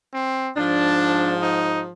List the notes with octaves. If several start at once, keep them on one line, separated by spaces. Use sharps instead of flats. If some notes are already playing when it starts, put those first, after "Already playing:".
C4
G#2 F3 D4
D#4